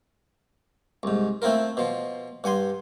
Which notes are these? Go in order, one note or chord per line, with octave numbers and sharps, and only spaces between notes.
C2 G#2
A3 C4 E4 F4 A#4
B2 F3
G2 F#5 G#5 C6